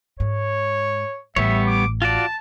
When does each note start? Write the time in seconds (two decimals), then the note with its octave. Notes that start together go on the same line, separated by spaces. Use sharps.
0.20 G#2 C#5
1.36 A1 G3 B3 C#5 E5
1.67 D6
2.02 F4 F#4 D5 A5